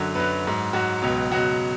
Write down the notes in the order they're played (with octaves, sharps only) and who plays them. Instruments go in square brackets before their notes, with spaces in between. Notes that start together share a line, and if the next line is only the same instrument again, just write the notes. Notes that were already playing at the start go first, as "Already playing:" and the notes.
Already playing: [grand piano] F#2 D3 F#3
F#2 D3 F#3 B4
G#2 F#3
G#2 F#3 F#4
C#2 B2 F#3
C#2 B2 F#3 F#4